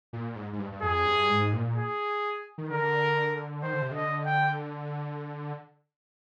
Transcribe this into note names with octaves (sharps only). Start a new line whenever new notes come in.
A#2
G#2
G#2
G2
G2
F2 G#4
G2
G#2
A#2
G#4
D#3
D3 A#4
D#3 C5
D3
C3
D3 D#5
G5